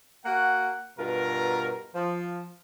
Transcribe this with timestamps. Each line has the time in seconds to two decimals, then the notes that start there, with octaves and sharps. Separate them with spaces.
0.25 A#3 F#4 F#5
0.99 G2 B2 F4 A#4
1.94 F3